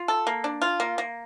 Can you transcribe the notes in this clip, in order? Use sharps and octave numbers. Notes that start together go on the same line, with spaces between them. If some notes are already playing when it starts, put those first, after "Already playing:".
Already playing: F4
A4
A#3
D4
F4
A#3
A#3